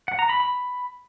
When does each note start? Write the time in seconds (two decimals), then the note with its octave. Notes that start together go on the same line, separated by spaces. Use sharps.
0.08 F#5
0.19 A#5
0.29 B5
0.40 B5